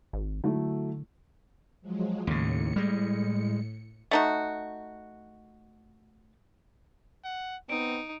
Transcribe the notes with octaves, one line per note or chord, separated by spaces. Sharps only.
G#1
D3 F#3 A3 E4
F3 F#3 G#3
D#2 A2 C#3 C#7
G3 G#3
A3 D#4 F#4
F#5
B3 C4 D#4 D7